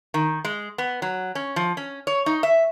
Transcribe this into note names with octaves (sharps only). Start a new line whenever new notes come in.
D#3
G#3
B3
F#3
C#4
F3
C#4
C#5
D#4
E5